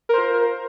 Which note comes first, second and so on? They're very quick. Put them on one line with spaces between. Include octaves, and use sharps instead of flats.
A#4 C5 F4